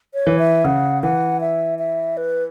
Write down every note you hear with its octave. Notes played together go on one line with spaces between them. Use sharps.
C#5
E3
E5
C#3 F#5
E3 F#5
E5
E5
B4